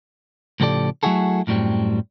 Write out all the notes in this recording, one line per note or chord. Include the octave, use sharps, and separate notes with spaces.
A2 C#3 F3 G4 A4 D5
F#3 A3 E4 F#4 G#4 A4
F#2 A2 F#3 G3 C4